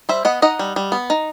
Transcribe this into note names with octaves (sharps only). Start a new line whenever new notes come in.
G3 C5 E5
B3 D#5 F#5
D#4 D#5 F#5
G3
G3
B3
D#4